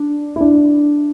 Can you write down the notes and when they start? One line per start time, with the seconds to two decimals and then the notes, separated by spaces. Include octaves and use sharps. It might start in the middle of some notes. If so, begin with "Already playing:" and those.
Already playing: D4
0.36 E4
0.41 D4